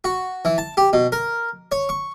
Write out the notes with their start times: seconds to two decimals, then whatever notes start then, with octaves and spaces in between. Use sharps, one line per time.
0.04 F#4
0.45 E3
0.58 A5
0.77 G4
0.93 B2
1.12 A#4
1.72 C#5
1.89 C#6